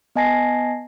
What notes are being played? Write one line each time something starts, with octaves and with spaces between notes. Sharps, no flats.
B3 D#5 G#5 A5 A#6 C7